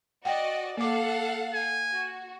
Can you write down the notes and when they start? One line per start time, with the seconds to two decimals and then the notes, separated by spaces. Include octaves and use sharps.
0.25 F#4 D5 D#5 F#5 G5
0.77 A#3 A4 F5 F#5 D6
1.54 G#5
1.92 F#4